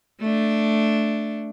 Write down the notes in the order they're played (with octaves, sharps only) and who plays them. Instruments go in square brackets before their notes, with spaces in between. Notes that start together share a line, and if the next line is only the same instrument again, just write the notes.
[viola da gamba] A3 D4